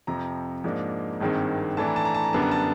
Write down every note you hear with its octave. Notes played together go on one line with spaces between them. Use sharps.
F2 C3 F3 A#5
G#2 F3 A#3 D4
G#1 G2 D#3 G#3 C4
A2 E3 A3 D4 A5
A#5
A5
A#5
A5
A#5
F#2 D3 G3 B3 D4 A5
A#5
A5